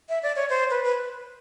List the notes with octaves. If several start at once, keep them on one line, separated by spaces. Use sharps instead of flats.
E5
D5
C#5
C5
B4
B4